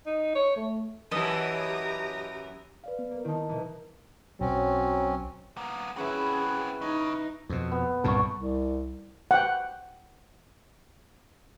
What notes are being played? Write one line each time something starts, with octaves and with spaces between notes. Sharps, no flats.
D#4
C#5
A3
F#2 E3 G4 B4 D#5 A5 A#5 D#6
B4 D5 F5
B3
A#3
D#3 C4 D#4 E4 A5
C2 B2 E3
B1 F#3 C4 C#4
A#3 B3
C4 C#4 E4 F#4 G#4 B4 B5
C#3 D#4
F2 B2
B3
C2 G2 A#2 A4 C#6
C2
F#5 G5